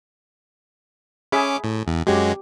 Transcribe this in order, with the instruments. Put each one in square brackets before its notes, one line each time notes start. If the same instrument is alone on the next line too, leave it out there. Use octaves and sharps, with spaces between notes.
[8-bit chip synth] C#4 D6 [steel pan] G#4 E5 B5
[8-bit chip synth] A2
E2
[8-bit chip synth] F#2 F#3 G#3 [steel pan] G4